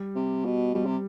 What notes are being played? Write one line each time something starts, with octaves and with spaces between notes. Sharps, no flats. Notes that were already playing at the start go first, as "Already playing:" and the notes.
Already playing: G3
C3
B2
B2 G3
C3